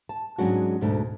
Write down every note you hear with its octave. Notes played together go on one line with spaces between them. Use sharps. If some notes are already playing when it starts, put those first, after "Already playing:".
A5
G#2 F#3 G#3 C#4 D4 F#4
D2 G#2 B2 A3 D4